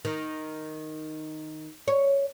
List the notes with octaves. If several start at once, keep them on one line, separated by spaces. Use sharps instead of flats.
D#3
C#5